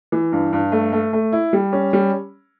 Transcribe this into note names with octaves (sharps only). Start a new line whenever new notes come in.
E3
G2
G2
A3
A3
A3
E4
G3
C#4
G3